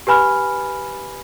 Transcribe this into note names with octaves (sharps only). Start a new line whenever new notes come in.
G4 B4 G#5 B5 F6